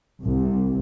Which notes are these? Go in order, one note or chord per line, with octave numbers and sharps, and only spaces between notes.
C2